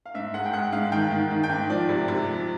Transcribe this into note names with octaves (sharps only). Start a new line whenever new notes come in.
F5
G#2 E5
G#3 F#5
G5
G#3 F#5
G#2 F5
D#3 G5
D#3
D#3
G5
G#2
F3 D5
C3
C3
F3